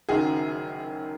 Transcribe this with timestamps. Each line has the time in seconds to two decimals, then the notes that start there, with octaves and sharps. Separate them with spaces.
0.09 F#1 F#2 D#3 F#3 G#4